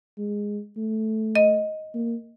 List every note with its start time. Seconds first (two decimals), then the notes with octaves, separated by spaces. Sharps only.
0.18 G#3
0.77 A3
1.35 D#5
1.95 A#3